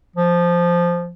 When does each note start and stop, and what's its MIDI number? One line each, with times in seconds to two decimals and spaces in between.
0.16 1.14 53